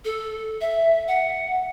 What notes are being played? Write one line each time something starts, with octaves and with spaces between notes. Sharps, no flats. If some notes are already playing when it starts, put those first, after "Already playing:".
A4
E5
F#5